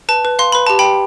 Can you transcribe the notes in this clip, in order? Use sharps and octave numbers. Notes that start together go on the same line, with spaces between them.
B4 A5
B4
F5 C6
B4 B5
G4 A5
G5 B5
G4